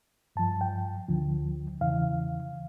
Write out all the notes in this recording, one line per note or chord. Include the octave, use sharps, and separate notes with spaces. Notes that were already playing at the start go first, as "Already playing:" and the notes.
G2 F3 A5
G5
D2 D3 F3
E2 C#3 E3 F5